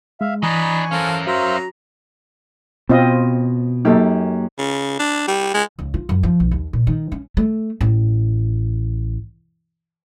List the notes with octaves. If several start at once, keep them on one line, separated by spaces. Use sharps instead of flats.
G#3 E5 F5
E3 D4 D#5 G#5 A#5 B5 C#6
C#4 A4 A#4 C5 F5
F#3 F#4 C5 E5 F5 A#5
B2 C4 F4 D#5
F#2 A#3 D#4 G4 A4
C#3
D4
G3
G#3
C#2
F4
F#2
F3
B1
D#2
A#2
D#3
C#4
A3
A1